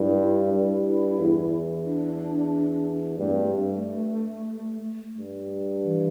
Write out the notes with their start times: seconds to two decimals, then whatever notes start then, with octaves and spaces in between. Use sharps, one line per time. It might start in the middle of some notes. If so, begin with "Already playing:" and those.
Already playing: G2 E4
0.53 G2 E4
1.19 E2
1.85 D4
3.19 G2 A3
3.31 C4
3.42 A3
5.18 G2
5.84 E3